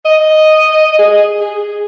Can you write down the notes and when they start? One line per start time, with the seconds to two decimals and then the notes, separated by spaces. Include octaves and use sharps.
0.05 D#5
0.98 G#4
1.40 G#4